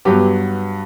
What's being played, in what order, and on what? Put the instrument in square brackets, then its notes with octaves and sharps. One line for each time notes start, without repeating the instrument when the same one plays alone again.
[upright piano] G2 F#3 B3 G4